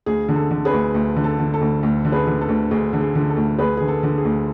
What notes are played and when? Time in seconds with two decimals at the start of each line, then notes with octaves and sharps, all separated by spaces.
0.06 D2 G#4
0.29 D3
0.36 A4
0.51 D3
0.65 G#4 B4
0.73 D2
0.95 D2
1.16 D3
1.24 A4
1.39 D3
1.54 A4
1.61 D2
1.83 D2
2.05 D3
2.12 G#4 B4
2.27 D3
2.41 A4
2.49 D2
2.71 D2 G#4
2.93 D3
3.01 G#4
3.15 D3
3.30 A4
3.36 D2
3.59 D2 G#4 B4
3.77 D3 G#4
3.88 A4
4.03 D3
4.18 G#4
4.25 D2